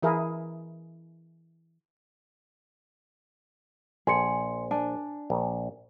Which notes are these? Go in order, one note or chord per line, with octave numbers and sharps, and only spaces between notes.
E3 E4 G#4 A#4
A#1 G#4 G#5 C6 C#7
D4 G#5 A5
A#1